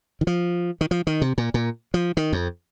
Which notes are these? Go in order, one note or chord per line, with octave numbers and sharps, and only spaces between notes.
D#3
F3
D#3
F3
D#3
C3
A#2
A#2
F3
D#3
F2